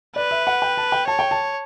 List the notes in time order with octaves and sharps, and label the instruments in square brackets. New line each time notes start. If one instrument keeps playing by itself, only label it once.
[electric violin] B4 [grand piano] D5
[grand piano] E5
F#5
G5
A5
G5
[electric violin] C#5 [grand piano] A5
[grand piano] G5
A5